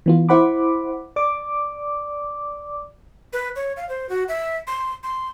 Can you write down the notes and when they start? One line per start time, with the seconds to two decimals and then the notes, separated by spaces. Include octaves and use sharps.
0.06 E3 B3 F4
0.29 E4 C5 F#5 B5 D6
1.16 D5 D6
3.33 B4
3.56 C#5
3.77 F5
3.89 C5
4.09 F#4
4.28 E5
4.67 C6
5.03 C6